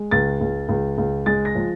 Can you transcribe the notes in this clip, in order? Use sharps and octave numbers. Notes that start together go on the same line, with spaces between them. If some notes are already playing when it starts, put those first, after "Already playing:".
Already playing: G#3
C#2 A6
C#2
C#2
C#2
G#3 A6
A#6
F3